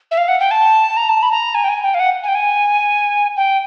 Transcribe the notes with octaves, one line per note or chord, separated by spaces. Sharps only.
E5
F5
F#5
G5
A5
A#5
A5
B5
A#5
G#5
G5
G#5
G5
F5
F#5
G#5
G5
G#5
G5